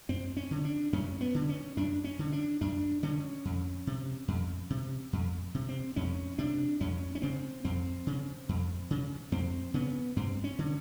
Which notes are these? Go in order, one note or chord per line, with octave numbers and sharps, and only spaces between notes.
F#2 C4
C#4
D3
D4
F#2 C#4
B3
D3
C#4
F#2 D4
C#4
D3
D4
F#2 D4
D3 C#4
F2
C3
F2
C3
F2
C3
C4
F2 C#4
C3 D4
F2 C#4
C#4
C#3 C4
F2 C4
C#3
F2
C#3
F2 C4
C#3 B3
G2 C4
C#4
D3